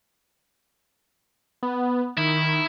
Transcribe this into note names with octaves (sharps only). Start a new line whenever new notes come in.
B3
D#3 E4